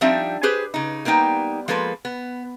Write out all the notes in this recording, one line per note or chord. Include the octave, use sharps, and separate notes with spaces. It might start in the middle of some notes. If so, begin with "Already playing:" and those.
F3 G3 C4 D4 D#4 E5
G4 G#4 B4 C5
C#3 D#4
G3 A#3 B3 D#4 G5
F3 G#3 A#3 A4 B4
B3